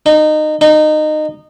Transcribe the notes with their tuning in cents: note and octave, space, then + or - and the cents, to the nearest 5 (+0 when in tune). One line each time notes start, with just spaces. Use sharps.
D#4 -20
D#4 -20